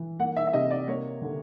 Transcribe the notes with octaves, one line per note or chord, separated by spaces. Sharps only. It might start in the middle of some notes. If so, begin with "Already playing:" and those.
Already playing: E3
A#3 F#5
E5
E5
C3 D#5
D5
A#3 C#5
D3